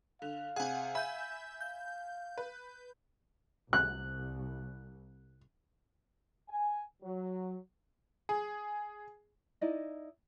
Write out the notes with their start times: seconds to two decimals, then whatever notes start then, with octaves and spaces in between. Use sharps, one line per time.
0.22 D3 F5
0.56 C3 G#4 F#5 G#5
0.95 E5 G#5 B5 G6
1.61 F5 G6
2.38 B4
3.73 C2 F#6
6.49 G#5
7.02 F#3
8.29 G#4
9.61 D#4 E4 D5 D#5